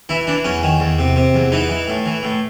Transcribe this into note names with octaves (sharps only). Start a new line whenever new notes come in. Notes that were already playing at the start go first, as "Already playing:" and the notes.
E3 E4
E3 D4
E2 C#4
D#3
E2
C3
C3
E2
E3 D#4
E3
A2
E3
A2